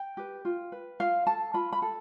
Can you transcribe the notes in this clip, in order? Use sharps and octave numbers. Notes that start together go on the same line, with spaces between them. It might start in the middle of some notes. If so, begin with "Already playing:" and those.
Already playing: G5
G4 B4
F4
B4
F4 F5
A4 A5
F4 B5
B5
A4